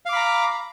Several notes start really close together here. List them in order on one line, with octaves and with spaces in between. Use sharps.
F5 D6 B5 A#5